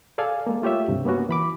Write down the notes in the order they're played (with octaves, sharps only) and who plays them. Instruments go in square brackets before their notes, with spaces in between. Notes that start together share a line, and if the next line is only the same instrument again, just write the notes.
[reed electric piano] G#4 A4 D5 F5 G#5
G#3 A#3
A3 F4 G4 C#5 E5
C#2 G2 C3
A#3 B3 C#4 F#4
E3 B5 D6